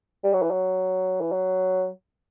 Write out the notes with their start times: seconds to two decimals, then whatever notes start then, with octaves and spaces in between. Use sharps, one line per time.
0.24 G3
0.33 F#3
0.42 E3
0.51 F#3
1.21 E3
1.32 F#3